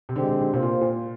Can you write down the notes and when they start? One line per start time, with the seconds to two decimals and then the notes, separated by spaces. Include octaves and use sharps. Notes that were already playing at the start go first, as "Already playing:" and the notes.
0.09 C3
0.15 D3 G#3 C4 G4
0.28 D3
0.41 D3
0.54 C3 A#3 F4 C5
0.63 A#2
0.81 A#2